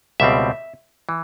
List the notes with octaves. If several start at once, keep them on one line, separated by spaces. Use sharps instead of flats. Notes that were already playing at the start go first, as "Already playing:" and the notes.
C#2 B2 G3 C4 E5
E3